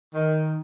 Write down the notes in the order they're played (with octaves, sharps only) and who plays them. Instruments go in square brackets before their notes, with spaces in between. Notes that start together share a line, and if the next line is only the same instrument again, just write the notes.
[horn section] D#3